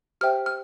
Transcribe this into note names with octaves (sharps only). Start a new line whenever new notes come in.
G4 C5 E5 G5 F6
F6